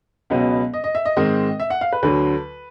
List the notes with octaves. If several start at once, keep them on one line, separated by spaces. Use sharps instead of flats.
C#2 B2 F#3 B3
D#5
D#5
E5
D#5
G#2 D#3 G#3 C4 D#5
E5
F#5
F5
B4
D2 D3 F#3 B4